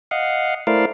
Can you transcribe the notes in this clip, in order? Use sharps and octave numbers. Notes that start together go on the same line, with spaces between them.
D#5 F5 F#5
A3 E4 A#4 C5 D5 F5